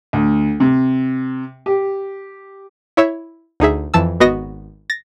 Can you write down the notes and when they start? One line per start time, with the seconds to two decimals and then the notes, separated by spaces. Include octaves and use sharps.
0.13 D2
0.60 C3
1.66 G4
2.97 E4 C#5 E5
3.60 D2 D#4 G#4 E5
3.94 F2 E3 A5 E6
4.20 G#1 B3 F#4 D#5 A#6
4.90 A6 A#6